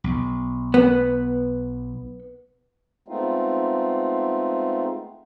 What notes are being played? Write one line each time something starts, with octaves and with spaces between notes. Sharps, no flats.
B1
B3
G#3 A3 B3 C4 D#4 F4